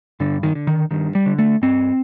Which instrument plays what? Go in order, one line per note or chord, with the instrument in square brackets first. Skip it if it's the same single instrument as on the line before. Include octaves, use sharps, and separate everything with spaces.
[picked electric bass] G2 D3
D#3
D3
D#3
G2 D#3
G3
D3
A3
G2 C4